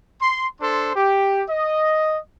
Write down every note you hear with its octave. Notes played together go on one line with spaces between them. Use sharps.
C6
D4 A4 C5 C6
G4
D#5